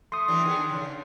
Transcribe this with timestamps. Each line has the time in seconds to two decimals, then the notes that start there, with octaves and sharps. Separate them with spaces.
0.12 A3 C6 D#6
0.28 E3 G3 D4
0.44 D#3 B3 G#4
0.56 D4
0.69 C#3